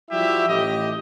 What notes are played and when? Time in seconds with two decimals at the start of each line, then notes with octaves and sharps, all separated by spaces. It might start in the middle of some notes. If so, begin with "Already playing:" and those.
0.11 F3 G3 E4 F#4 G4 E5
0.48 A1 G4 D#5